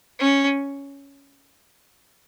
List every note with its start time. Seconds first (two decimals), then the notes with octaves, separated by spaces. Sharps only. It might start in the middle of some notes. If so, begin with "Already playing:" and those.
0.19 C#4